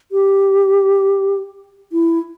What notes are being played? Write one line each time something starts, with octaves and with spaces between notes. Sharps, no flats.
G4
E4